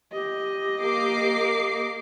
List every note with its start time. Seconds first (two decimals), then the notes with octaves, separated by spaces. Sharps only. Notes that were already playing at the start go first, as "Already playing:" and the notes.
0.13 G4 D#5
0.82 A#3 D6 C7